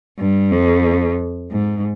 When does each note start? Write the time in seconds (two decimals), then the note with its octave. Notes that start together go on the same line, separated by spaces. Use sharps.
0.19 G2
0.52 F2
1.51 G#2